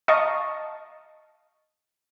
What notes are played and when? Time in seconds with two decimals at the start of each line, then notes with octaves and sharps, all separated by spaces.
0.08 D#5 F5 A5 A#5 C#6 D#6